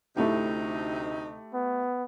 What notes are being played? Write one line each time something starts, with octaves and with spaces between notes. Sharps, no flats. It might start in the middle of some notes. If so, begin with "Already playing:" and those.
D2 C3 A3 D#4 E4 G4
B3